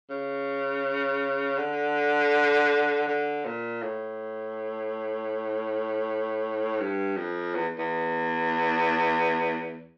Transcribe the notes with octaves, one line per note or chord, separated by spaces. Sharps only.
C#3
D3
D3
A#2
A2
G2
F2
E2
E2